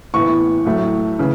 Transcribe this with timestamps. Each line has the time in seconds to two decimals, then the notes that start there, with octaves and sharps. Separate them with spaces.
0.14 A2 E3 B3 C#6
0.65 A2 F#3 A3
1.19 C#3 E3